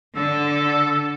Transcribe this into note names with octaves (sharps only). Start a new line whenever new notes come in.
D3 A4